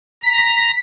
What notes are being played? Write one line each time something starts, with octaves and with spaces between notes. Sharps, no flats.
A#5 B6